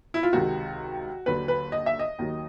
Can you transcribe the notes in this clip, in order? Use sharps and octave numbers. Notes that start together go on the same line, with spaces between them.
E4
F4
C#2 C3 D#3 F#4
D#2 D3 F#3 B4
B4
D#5
E5
D#5
D#2 D#3 F#3